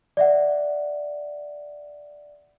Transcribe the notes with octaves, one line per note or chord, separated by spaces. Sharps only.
D5 E5 F#5